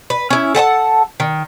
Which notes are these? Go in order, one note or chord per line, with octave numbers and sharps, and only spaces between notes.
B4
C#4 E4
A4 F#5 G5 A5
D#3